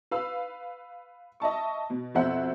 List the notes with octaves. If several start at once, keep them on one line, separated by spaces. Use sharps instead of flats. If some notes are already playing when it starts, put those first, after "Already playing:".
B4 F5 E6
D#5 E5 A5 C#6
B2
F2 B2 C5 E5 F#5